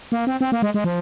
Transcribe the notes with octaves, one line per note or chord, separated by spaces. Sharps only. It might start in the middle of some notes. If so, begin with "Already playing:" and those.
A#3
C4
C4
A#3
G#3
G#3
F3